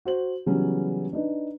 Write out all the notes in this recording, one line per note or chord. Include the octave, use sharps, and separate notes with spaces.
F#4 C5 F#7
C#3 E3 F#3 G3 B3 C#4
D4 D#4 B4